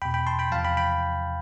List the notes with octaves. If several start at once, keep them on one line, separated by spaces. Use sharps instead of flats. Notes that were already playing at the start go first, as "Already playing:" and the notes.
E2 B2 G5 B5
G5 B5
A5 C6
G5 B5
E2 C3 F3 F5 A5
G5 B5
G5 B5